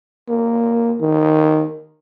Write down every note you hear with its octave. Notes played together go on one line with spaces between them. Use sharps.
A#3
D#3